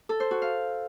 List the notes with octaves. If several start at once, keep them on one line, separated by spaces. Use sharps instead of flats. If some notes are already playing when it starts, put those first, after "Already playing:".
A4
C5
F#4
F5